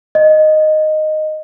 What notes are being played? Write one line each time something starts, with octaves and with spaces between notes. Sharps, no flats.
D#5